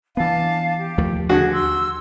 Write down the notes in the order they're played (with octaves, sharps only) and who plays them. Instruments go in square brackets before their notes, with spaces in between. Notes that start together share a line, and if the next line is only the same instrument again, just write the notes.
[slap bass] E3 B3 [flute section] D4 F5 A5
[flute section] G4
[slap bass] D#2 F3 A3
[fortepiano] D3 F#4 [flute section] G#4
[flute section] C6 E6